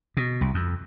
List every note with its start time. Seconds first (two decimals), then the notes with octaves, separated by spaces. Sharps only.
0.17 B2
0.41 C2
0.54 F2